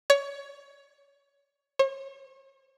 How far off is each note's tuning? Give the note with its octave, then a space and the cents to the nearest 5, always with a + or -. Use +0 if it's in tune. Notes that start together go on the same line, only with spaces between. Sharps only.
C#5 +20
C#5 -40